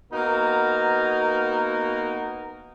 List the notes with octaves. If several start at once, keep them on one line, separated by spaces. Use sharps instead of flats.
A#3 B3 D#4 F#4 A#4